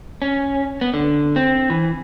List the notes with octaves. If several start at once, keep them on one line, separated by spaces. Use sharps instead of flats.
C#4
B3
D3
C4
E3